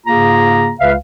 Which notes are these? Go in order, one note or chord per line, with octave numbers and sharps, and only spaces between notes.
G#2 C#3 A#3 F4 G#4 A#5
C#2 C#3 B4 E5 F5